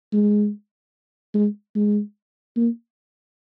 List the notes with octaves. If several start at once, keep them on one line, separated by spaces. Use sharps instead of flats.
G#3
G#3
G#3
A#3